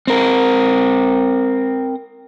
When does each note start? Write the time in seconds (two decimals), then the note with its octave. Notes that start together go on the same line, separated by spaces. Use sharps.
0.07 C4 A#4